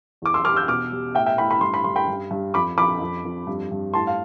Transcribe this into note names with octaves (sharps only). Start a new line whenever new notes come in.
E2 D6
C6 E6
G3 D6 F6
E6 G6
B2 D6 F6
G3
A2 E5 G5
E5 G5
A2 G5 B5
B5
G2 C6
B5
G2 C6
G5 B5
G2
G2
F2 B5 D6
F2 B5 D6
F2
F2
G2
G2
A2 A5 C6
F5